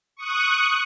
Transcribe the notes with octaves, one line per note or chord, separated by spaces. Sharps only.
C#6 D#6 F#6